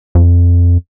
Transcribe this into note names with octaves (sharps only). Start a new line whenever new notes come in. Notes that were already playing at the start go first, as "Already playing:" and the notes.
F2